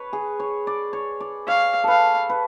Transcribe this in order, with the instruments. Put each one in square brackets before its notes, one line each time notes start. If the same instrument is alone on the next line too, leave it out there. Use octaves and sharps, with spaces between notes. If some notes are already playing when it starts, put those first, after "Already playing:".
Already playing: [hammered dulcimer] B4 C#5
G#4
C#5
D5
C#5
D5
[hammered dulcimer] C#5 [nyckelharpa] F5
[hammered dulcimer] A4 B4 [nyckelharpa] F5
[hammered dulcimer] B4